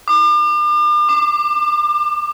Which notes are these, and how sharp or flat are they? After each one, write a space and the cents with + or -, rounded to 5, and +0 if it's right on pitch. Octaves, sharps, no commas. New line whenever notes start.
D6 +40
D6 +15